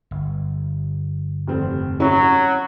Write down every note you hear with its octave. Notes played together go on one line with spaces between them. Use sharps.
G1
F1 C4
F#3 C#4 E4